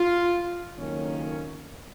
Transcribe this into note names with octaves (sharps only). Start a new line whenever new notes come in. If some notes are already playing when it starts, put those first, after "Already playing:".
Already playing: F4
F#1 F2 D#3 A#3 C#4